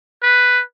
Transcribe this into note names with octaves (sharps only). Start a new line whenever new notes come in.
B4